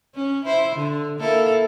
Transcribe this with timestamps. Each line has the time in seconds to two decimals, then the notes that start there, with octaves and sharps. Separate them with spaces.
0.15 C#4
0.45 E4 C5
0.75 D3
1.19 A#3 E4 A4